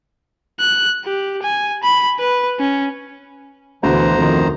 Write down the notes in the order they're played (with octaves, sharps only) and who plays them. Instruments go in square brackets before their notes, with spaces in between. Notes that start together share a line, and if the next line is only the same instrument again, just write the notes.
[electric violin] F#6
G4
G#5
B5
B4
C#4
[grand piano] D2 B2 [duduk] E3 [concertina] C5 A#5
[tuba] F2 [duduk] D#3